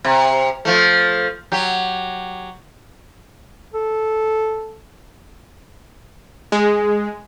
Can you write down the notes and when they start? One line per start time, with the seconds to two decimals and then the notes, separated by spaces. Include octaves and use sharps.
0.05 C3
0.65 F3 A3
1.52 F#3 G4
3.74 A4
6.52 G#3